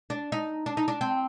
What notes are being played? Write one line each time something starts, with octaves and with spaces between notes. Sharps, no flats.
D4
D#4
D4
D#4
D4
C4